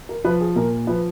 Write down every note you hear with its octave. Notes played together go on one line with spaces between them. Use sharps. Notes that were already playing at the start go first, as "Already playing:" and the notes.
A#4
F3 B4
G#4
A#2 A#4
F3 B4